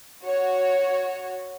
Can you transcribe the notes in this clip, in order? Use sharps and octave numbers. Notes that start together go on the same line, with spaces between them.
F#4 C#5